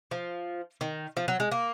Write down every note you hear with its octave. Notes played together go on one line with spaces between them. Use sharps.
F3
D#3
F3
F#3
G#3
A#3